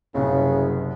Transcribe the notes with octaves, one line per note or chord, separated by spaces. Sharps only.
F#1 C2 F#2 C#3